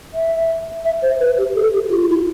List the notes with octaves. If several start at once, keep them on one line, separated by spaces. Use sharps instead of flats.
E5
E5
C5
B4
G4
A4
G4
G4
F4
F4
E4